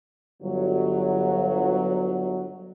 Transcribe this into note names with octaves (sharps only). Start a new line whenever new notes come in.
G1 F#3